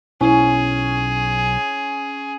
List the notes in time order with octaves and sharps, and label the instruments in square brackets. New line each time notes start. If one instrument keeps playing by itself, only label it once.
[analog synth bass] B1 [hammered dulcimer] C#4 [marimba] E4 [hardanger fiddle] G#4